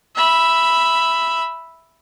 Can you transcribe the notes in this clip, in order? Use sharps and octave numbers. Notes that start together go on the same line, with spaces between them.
E5 B5